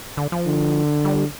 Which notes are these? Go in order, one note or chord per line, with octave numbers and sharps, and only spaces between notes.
D3
F3
D3
G3